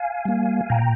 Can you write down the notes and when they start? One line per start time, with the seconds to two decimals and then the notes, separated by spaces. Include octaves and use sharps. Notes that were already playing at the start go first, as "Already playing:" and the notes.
Already playing: F5 G#5
0.25 G3 A#3
0.70 A#2 G5 A#5